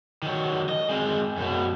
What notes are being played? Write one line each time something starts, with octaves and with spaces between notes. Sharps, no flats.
D#3 F#3
D#5
G#3 C4
F#2 B2